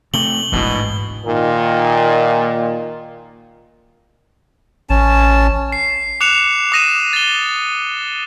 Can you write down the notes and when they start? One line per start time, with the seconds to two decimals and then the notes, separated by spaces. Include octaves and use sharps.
0.14 C3 A3 F#7 G7
0.52 A1 D2 G#2 B2 E3
1.25 A#2 D#3
4.90 A1 C#4 A5
5.72 C7
6.21 D6 F#6 C#7 E7 F7
6.72 D6 D#6 A#6 D#7 E7
7.13 A6 G7